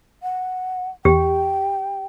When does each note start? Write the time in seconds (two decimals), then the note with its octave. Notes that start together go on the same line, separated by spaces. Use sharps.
0.23 F#5
1.05 E2 G4 G5